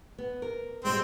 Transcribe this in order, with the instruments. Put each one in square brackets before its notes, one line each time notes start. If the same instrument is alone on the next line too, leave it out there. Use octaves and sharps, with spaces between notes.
[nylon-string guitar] B3
A#4
[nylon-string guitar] B2 G3 G#3 [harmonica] C4 C5